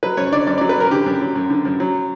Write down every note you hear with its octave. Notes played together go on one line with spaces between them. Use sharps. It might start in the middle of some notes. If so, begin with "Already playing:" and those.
F#3 B4
F#2 C#5
D3 D5
F#2 D5
D5
F#3
B4
F#2 A#4
D3 G4
F#2
F#3
F#2
D3
F#2
F#3